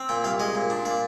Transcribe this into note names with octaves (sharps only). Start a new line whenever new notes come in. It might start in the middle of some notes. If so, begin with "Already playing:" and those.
Already playing: C4
A#2 G5
C2 F5
G#3 D#5
A#2
D4
A#2 D5